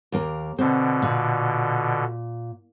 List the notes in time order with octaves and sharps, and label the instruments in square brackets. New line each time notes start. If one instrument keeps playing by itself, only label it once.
[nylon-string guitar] D#2 A#3 A#4
[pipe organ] B2 D3 [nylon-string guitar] C4
[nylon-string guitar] A#2